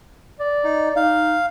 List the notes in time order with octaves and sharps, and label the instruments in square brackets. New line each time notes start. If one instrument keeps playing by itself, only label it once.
[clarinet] D5
[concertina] D#4
[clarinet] D#4 [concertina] F5